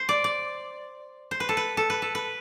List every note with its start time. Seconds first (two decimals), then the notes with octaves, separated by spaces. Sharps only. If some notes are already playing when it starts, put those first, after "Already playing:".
Already playing: C5
0.09 D5
0.24 D5
1.31 C5
1.40 B4
1.49 A4
1.57 B4
1.77 A4
1.90 B4
2.02 A4
2.15 B4